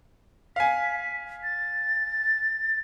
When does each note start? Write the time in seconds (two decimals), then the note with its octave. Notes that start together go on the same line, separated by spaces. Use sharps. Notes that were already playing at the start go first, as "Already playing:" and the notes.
0.56 F5 G#5 B6
1.43 A6